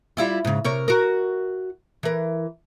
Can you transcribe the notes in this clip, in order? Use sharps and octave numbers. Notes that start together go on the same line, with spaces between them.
G3 E4 F4
G#2 C#3
C3 A#4 C#5
F#4 A#4
E3 A#4